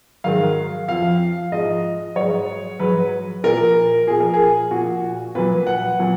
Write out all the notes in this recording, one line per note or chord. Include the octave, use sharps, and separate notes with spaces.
G#2 D#3 F#3 F5
F2 F3 F5
G#2 F3 D#5
G#2 F#3 C#5
G#2 F#3 B4
A#2 F3 A#4
A#2 F3 G#4
A#4
G#4
A#2 F3 F#4
A#2 F#3 B4
F#5
A#2 F#3